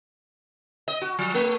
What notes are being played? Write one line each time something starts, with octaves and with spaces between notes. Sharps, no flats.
D#5
F#4
F3
A3